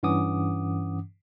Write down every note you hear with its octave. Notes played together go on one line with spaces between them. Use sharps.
G2 E3 C#4 F#5 D6 D#6